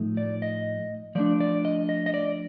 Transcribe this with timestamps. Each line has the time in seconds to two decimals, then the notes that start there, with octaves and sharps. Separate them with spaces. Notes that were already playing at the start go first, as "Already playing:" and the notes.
Already playing: A2 F3 A3 D#4
0.17 D5
0.42 D#5
1.15 F3 A3 D4 D5
1.40 D5
1.65 D#5
1.89 D#5
2.06 D#5
2.14 D5